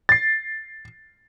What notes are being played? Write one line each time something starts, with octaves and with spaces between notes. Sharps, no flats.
A6 C7